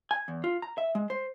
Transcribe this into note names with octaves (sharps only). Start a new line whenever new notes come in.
G#5
E2
F4
A#5
E5
G#3
C5